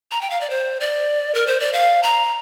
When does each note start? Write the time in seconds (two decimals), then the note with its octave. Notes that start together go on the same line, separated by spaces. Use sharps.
0.12 A#5
0.21 G5
0.30 F5
0.41 D5
0.50 C5
0.81 D5
1.35 A#4
1.47 C5
1.60 D5
1.73 F5
2.03 A#5